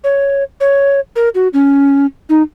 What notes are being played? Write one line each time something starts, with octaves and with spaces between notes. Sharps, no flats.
C#5
C#5
A#4
F#4
C#4
D#4